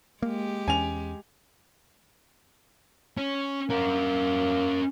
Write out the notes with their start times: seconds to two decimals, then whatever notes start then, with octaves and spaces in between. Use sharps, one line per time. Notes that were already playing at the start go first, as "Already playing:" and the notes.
0.22 G#3 A#3 G4
0.68 E2 C#4 G#5 F7
3.17 C#4
3.70 A#3 C#4 A#4